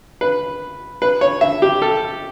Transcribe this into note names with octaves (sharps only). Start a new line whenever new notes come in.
B4
B4
C#5
E5
G4
A4